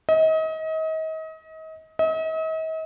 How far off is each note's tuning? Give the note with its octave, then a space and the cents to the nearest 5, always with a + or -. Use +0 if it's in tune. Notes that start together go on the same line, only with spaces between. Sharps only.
D#5 +35
D#5 +45